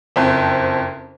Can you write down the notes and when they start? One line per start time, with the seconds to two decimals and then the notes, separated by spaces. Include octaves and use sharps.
0.16 F#1 F2